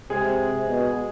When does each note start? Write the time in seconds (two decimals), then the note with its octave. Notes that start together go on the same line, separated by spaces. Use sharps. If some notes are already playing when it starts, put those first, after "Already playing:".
0.10 C3 G#3 G#4
0.68 B2